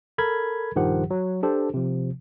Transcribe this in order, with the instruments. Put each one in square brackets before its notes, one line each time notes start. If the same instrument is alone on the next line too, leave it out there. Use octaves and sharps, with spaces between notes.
[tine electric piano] A4 A#4 B5 G#6
A#1 G2 D#3 F3 G4 F#5
F#3
D4 G4 A4 C5
C3 F3